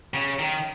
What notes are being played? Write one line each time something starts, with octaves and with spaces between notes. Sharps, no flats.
C#3
D#3